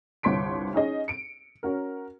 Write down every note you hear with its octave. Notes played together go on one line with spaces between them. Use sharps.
G1 C2 C#5 C6 B6 D7
C#4 D#4 G#4 D#5
C#7 D7
C#4 F#4 A#4